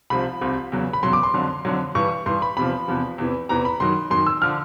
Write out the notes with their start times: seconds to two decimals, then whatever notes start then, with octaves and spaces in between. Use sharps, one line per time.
0.10 C2 C3 F3 B5
0.41 C2 C3 F3
0.72 E2 C#3 F#3
0.93 B5
1.03 E2 C#3 F#3 C6
1.13 D6
1.23 C6
1.34 F2 D3 F#3
1.65 F2 D3 F#3
1.95 G2 E3 C#6
2.26 G2 E3 C6
2.42 B5
2.57 E2 C3 F3 B5
2.88 E2 C3 F3
3.18 E2 C3 E3
3.49 E2 C3 E3 A#5
3.65 B5
3.80 F#2 D#3 F#3 C6
4.10 F#2 D#3 F#3 C6
4.26 E6
4.42 D3 F3 F6